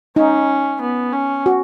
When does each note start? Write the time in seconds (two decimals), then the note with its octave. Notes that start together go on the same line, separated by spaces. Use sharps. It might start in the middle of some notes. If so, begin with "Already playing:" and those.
0.16 C#4 D#4
0.82 B3
1.13 C#4
1.46 F#4